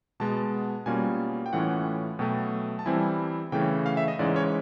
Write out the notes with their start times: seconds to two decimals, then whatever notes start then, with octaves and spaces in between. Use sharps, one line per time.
0.20 B2 G#3 B3 A5
0.86 B2 G3 A#3 C#4 F4 G#5
1.46 G5
1.53 A2 E3 A3 C#4 F4 F#5
2.19 B2 F#3 A3 G5
2.79 A5
2.86 E3 G3 C4 E4 G#5
3.52 C#3 E3 A3 C#4 G5
3.86 F5
3.97 E5
4.08 D#5
4.19 G#2 E3 G#3 C#4 D5
4.36 C#5